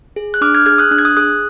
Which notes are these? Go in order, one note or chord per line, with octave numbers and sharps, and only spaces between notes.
G#4
F#6
D4 D6 F6
F6 G#6
G#4 F6 G#6
D#6 F#6
D4 F#6
G#6
D#6 F#6
G#4 D#6 F#6